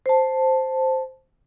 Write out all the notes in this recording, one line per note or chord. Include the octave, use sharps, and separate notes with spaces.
C5 A5